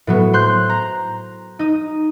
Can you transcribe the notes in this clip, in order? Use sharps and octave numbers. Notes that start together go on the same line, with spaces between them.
A2 F#3 B3
C5 C6 F#6 G6
A#5
D#4 D#6